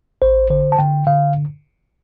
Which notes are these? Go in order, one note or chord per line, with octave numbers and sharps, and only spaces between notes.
A1 C5
D3 C5
A5
D3 G5
D3 F5